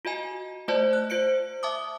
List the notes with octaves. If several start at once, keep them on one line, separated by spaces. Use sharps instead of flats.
F4 F#4 D#5 G#5
A3 F4 C5 D5 D#5 A5
F#6
F4 C5 C#7 D7
E5 A5 D6 D#6